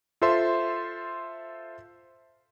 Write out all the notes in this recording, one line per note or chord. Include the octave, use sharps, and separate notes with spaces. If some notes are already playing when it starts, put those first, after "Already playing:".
F4 A4 C5 E5 C6